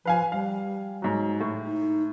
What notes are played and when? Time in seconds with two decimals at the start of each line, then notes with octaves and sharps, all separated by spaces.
0.05 F3 B4 F5 G#5
0.32 G3 F5
1.02 G#2 F#3
1.41 A2
1.65 D#4